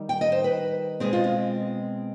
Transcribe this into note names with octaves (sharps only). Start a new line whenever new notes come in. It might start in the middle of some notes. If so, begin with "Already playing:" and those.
Already playing: D#3 G3 D#4
G5
D#5
C5
B4
B2 G#3 C4 G#4
F4
F4